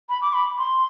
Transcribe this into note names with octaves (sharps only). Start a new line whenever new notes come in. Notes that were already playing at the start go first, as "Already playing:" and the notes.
B5
D6
B5
C6